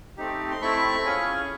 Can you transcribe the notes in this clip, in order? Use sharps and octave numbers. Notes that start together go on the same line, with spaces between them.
A3 C4 D#4 G4
C6
A3 C4 E4 B5 C#6
C#4 F4 G#4